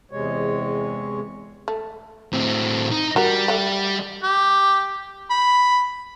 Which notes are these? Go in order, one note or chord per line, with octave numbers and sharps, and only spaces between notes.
E2 C3 G#3 C#5
A3
A2 C4
D#4
G3 F#4 A#4
A3 F#5
G4
B5